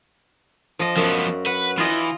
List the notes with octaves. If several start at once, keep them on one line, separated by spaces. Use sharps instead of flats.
F3 D#5
F#2 F3 B3
B4 F#5
E3 F4 D#5